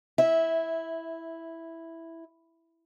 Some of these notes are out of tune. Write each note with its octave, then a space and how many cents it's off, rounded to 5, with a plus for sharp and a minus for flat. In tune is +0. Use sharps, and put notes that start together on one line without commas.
E4 +0 E5 -15